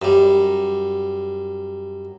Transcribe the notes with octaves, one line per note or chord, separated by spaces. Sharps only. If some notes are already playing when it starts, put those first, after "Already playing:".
F#2 G3